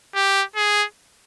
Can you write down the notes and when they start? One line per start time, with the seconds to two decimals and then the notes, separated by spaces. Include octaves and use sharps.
0.15 G4
0.56 G#4